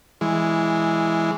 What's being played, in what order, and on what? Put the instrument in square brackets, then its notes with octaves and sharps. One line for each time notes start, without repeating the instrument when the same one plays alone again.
[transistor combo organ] E3 G#3